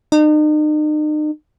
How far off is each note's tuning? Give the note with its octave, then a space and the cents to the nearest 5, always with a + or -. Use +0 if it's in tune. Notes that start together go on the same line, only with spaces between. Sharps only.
D#4 -40